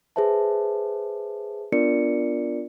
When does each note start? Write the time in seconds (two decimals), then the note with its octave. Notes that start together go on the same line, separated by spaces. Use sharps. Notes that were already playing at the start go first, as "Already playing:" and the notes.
0.16 G#4 B4 C5 E5 A5
1.72 B3 D4 F4 A#4 D5 C#7